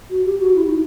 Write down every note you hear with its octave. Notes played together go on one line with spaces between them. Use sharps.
F#4
G4
F#4
E4
D#4